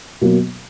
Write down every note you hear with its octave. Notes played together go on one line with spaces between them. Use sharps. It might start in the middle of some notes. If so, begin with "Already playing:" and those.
B2 F#3 A#3